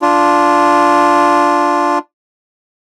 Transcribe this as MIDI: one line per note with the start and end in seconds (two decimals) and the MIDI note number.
0.02 1.99 62
0.02 1.99 65